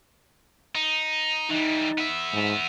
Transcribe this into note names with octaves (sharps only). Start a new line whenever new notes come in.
D#4
E3 G3 D#4
B3 E5
G#2